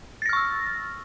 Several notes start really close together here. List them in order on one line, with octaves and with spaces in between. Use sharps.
A6 A#6 F6 C#6 E6